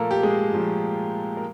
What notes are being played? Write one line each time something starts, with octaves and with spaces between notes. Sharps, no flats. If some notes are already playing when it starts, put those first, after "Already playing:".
Already playing: A#2 F3 A3 A#3 A4 A#4
G4
G#3 G#4
A#2 F3 A3
A#4